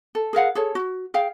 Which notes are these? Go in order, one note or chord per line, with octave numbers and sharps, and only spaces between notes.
A4
G#4 A#4 F5 F#5
G#4 A4 C#5
F#4
G#4 F5 G5